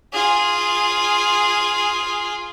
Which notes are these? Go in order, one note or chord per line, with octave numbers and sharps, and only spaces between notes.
F4 G#4